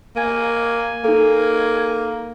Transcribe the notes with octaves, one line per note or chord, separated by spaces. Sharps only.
A#3 G#5
A#3 D#4 A4